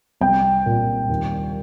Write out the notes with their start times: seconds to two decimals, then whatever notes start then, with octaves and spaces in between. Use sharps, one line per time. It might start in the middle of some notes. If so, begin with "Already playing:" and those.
0.21 C2 G5
0.66 A#2
1.09 D#2